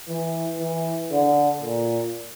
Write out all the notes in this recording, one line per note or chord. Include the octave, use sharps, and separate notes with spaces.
E3
E3
D3
A#2